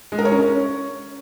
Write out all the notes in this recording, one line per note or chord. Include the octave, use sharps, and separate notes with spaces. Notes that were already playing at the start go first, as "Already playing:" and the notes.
G#3
A#4
C#5
C#4